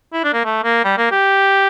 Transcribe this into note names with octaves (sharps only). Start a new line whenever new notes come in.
E4
D4
A#3
A3
A#3
G3
A#3
G4